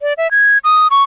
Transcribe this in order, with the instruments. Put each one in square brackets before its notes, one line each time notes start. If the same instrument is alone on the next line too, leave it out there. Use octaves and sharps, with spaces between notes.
[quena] D5
E5
G#6
D#6
C#6